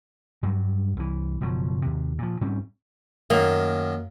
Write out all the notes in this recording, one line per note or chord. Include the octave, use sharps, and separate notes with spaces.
G2 F#3 G3
C2 E3
F#1 B2 F3 F#3
D#2 C3
A#2 F3
G#2 G3 C4 C#4
F#2 D#3 A#3